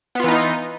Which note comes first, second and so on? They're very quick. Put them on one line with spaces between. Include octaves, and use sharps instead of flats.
B3 F4 E3 D#4